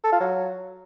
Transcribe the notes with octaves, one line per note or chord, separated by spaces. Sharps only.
A4
F4
F#3